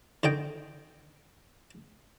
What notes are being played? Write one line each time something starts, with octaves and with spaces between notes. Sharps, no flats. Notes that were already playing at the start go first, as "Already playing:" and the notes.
D3 D#3 D#5 G5